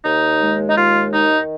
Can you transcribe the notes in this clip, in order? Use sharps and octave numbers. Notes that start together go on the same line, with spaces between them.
D#2 D#4
G#3
D#4
D#2 F4
D#3 D#4